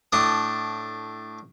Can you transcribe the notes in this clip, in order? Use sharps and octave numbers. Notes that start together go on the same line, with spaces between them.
A2 D4 D#6